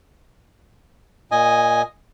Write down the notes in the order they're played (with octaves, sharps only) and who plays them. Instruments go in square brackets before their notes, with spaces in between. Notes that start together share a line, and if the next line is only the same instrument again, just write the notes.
[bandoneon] A#2 D#5 G#5